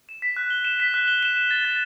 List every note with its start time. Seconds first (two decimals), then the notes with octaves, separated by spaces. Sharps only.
0.09 E7
0.22 B6
0.37 F#6
0.50 G7
0.65 E7
0.80 B6
0.94 F#6
1.08 G7
1.23 E7
1.36 E7
1.51 A6
1.65 A6